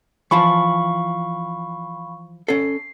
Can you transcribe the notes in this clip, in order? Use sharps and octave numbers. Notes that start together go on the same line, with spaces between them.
E3 F3 F5 A5 B5 C#6
C#4 A4 C7